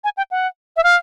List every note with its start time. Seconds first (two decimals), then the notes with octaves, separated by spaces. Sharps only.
0.04 G#5
0.17 G5
0.31 F#5
0.77 E5
0.84 F5